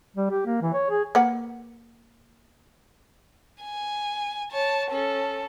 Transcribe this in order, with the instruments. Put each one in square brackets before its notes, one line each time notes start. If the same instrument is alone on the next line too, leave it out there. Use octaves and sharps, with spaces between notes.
[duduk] G3
G4
A#3
E3
C#5
G#4
[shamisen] A#3 B4 F#5
[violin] G#5
C#5 A5
C#4 A4